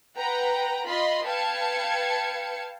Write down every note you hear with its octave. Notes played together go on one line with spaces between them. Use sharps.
B4 F#5 G5 A#5
F4 D#5 B5 C6
B4 F5 G5 A5 G#6 C#7